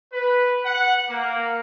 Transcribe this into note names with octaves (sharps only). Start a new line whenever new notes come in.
B4
F#5
A#3